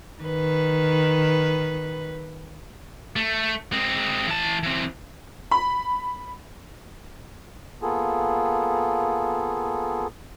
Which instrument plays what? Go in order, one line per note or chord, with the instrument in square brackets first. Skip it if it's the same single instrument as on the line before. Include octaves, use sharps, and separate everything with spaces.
[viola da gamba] D#3 B4
[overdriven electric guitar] A3
G#3 C4
E3 A5
E3 C4
[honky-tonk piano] B5
[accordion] A#3 B3 F4 G#4 A4